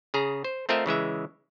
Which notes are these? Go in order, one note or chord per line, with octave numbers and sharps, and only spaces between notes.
C#3 G#4 A#5
C5
A3 C4 F4 A#4 D#5 E5
C#3 E3 G#3 E5